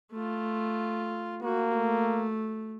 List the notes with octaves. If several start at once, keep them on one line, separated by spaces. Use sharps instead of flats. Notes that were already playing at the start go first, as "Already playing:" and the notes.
A3 F4
A#3 F#4
A3